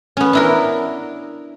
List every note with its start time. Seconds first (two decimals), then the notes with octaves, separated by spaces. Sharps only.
0.17 B3 C#4
0.33 D4 E4 A#4